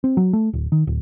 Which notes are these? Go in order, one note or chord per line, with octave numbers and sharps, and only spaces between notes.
C4
F#3
A3
D1
D#3
D1